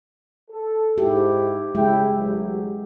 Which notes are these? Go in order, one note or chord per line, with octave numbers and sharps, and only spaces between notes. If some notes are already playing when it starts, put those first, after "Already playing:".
A4
G#2 E4 G4
C#3 G#3 E4 G5
A1 F#3